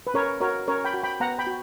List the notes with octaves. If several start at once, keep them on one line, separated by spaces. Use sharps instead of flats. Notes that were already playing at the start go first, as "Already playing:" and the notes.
B4
C#4 A#4 C#5
F#4 A#4 C#5
C#4 A#4 C#5
G5 B5
F#4
G5 B5
B3 F#5 A#5
G5 B5
F#4